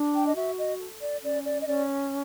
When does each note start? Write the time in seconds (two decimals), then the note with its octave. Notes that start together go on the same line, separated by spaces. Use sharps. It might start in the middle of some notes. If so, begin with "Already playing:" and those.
Already playing: D4
0.13 G5
0.26 D#5
0.35 F#4 E5
0.57 D#5
0.79 A4
1.00 D5
1.22 C#4 D5
1.44 D5
1.59 D#5
1.66 C#4 D5